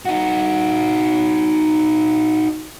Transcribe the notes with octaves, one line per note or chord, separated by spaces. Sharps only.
D#4 F#4